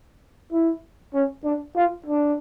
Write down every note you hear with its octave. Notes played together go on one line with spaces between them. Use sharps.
E4
C#4
D4
F4
D4